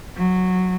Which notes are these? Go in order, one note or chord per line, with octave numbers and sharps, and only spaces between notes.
F#3